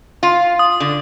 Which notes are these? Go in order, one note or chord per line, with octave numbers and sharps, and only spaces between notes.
F4
D#6
D3